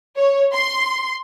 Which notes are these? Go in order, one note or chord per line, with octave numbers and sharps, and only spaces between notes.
C#5
C6